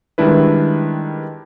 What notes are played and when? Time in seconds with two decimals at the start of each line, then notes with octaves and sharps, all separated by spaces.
0.18 D#3 G3 G#3 D4 E4 B4